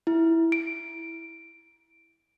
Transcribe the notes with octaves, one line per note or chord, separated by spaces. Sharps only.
E4
D7